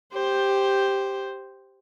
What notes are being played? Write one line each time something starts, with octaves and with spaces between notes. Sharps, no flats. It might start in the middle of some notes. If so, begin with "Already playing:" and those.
G4 C5